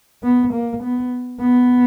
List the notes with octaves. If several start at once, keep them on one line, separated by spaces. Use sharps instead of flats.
B3
A#3
B3
B3